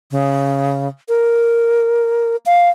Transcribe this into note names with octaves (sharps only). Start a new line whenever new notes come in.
C#3
A#4
F5